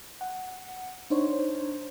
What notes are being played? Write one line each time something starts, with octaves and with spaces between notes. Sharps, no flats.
F#5
D4 D#4 C5 C#5